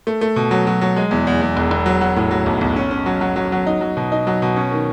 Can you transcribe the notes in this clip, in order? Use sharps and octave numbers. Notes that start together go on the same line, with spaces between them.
A3
A3
B2
F#3
F#3
F#3
G#3
E2
E2
E2
E1
E1
F#3
F#3
A2
F#3
B1
B1
C#4
C#4
F#3
F#3
F#3
F#3
D#4
F#3
B2
D#4
F#3
B2
C#4
D#3